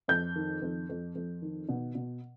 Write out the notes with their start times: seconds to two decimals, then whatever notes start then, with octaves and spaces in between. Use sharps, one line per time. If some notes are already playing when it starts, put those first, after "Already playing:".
0.08 F2 G6
0.36 D#3
0.62 F2
0.89 F2
1.15 F2
1.42 D#3
1.69 B2
1.95 B2